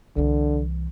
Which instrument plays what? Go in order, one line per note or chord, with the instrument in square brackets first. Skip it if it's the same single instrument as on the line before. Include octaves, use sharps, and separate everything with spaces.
[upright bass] C2 E3 [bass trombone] D3